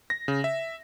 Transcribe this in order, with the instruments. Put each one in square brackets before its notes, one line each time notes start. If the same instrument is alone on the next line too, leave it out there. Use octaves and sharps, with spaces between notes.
[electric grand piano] A#6
C#3
E5